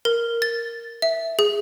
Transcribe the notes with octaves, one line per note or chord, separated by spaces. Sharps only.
A#4
A6
E5
G#4